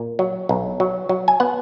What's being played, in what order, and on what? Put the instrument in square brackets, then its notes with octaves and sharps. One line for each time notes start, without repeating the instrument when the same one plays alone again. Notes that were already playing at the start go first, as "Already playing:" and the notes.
Already playing: [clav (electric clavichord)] A#2
F#3
B1
F#3
F#3
G#5
B3 F#5